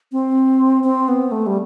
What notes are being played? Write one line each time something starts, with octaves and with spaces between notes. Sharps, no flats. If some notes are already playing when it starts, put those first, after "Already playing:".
C4
C4
B3
A3
G3